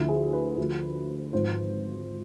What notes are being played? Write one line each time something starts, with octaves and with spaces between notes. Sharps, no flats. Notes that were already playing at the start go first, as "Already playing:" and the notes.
Already playing: D2 D3 F3 E4
G#4
B4
D2 D3 F3
G#1 G#2 F3 C5